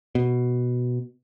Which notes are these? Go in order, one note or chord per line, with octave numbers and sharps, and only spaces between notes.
B2